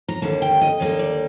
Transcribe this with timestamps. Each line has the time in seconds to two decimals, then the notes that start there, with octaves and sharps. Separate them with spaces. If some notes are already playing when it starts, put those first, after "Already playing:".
0.08 A#5
0.22 D#2 D3 G3 A#3 A5
0.42 G5
0.61 D#5
0.80 D#2 D3 G3 A#3 D#5
0.99 D5